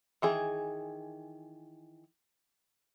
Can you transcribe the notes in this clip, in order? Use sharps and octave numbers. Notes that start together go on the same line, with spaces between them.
D#3 E3 G#4